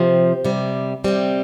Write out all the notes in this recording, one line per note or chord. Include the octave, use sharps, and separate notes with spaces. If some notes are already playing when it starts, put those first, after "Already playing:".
Already playing: C3 F3 G4 C5
C3 G3
C3 G3 C4